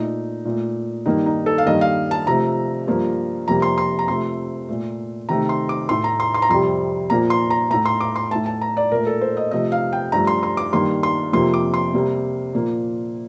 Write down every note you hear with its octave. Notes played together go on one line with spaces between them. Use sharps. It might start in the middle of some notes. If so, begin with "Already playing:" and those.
Already playing: A#2 A3 D#4
A#2 A3
G2 D#3 A#3 D#4
D#4
A4
F5
G2 D#3 A#3 D#5
F5
A5
C3 F3 A3 A#5
G2 F3 A#3
F2 C3 G3 A#3 A#5
C6
C6
A#5
C3 F3 A3 C6
A#2 A3
C3 D#3 A3 A#5
C6
D6
A2 A3 C6
A#5
C6
C6
A#5
F2 C3 G3 C6
A#2 F3 A#3 A#5
C6
A#5
A2 A3 A#5
C6
D6
C6
A2 A3 A5
A5
A#5
D5
A#2 A3 A#4
A4
C5
D#5
C3 F3 A3 D#5
F5
G5
G2 F3 A3 A#5
C6
C6
D6
G2 D#3 A#3 C6
C6
F2 C3 F3 A#3 C6
D6
C6
C3 G3 A#3
A#2 F3 A#3